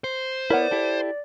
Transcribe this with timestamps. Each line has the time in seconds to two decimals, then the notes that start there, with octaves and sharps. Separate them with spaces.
0.04 C5
0.50 B3 E4 A#4 C#5 D5 F#5
0.71 E4 G4 A4